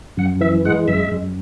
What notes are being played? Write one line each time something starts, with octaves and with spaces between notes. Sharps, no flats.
F#2 F#5
E3 E5
G#3 F#5
F#2 E5
F#2